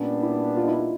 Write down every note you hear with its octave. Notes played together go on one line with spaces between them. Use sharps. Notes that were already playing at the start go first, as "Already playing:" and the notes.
Already playing: A#2 G3 B3 C#4 D4
E4
F4
D#4
E4
F4